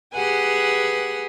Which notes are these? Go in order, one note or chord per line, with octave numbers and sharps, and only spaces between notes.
G4 G#4 B4 F#5 G#5